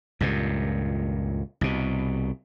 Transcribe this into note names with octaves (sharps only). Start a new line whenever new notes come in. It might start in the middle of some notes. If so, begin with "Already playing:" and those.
C#2 G2 A#2
C2 B2